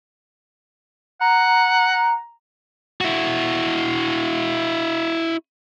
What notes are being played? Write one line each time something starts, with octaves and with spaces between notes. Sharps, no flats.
F#5 A#5
E4 F#4